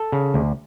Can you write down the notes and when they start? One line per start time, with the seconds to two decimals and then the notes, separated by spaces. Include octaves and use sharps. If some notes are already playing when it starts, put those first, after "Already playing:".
Already playing: A4
0.12 C#3
0.34 D2